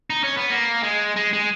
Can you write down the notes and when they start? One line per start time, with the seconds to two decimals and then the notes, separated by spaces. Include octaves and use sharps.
0.10 D#4
0.24 C#4
0.37 B3
0.50 A#3
0.83 G#3
1.17 G#3
1.33 G#3